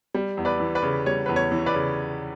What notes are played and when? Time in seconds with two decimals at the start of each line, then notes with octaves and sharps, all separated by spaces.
0.14 G3
0.37 E2
0.45 B4 D5
0.60 E3
0.75 B4 D5
0.83 C#3
1.06 G3 C#5
1.26 E2 B4
1.36 C#5
1.52 E3
1.66 B4 D5
1.74 C#3